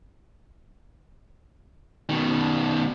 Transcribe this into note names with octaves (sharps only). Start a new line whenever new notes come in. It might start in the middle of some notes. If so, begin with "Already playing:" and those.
B2 D#3